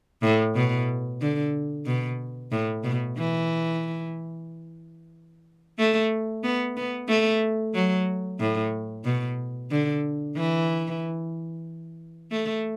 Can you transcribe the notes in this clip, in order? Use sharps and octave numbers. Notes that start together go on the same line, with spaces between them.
A2
B2
D3
B2
A2
B2
E3
A3
B3
B3
A3
F#3
A2
B2
D3
E3
A3